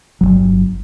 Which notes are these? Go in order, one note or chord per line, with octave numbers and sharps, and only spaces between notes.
G1 C2 F#3